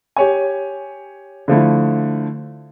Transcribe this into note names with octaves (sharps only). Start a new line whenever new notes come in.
G4 C#5 G#5
D3 F3 A3 E4